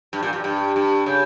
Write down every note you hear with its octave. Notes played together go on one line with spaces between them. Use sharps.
G2
A#2
G2
G2
G2
C#3